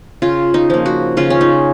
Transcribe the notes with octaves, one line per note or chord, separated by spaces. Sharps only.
C#3 F4
D#4
F3 A#3
F#4
C#3 F4
C#4
D#4